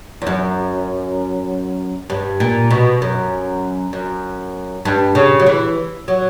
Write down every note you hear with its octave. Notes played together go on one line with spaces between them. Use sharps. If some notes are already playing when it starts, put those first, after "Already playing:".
E2
F#2
G2
A#2
B2
F#2
F#2
G2
C#3
F#3
E3
F#3